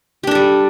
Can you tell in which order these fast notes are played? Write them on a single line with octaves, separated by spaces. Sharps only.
G4 D4 A4 G3